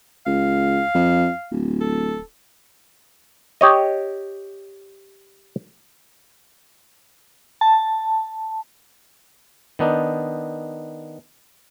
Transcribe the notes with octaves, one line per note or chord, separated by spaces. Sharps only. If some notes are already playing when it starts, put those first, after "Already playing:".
C#2 F5
F2
D1
A4
G4 C#5 D#5
A5
D#3 B3 D4 D#4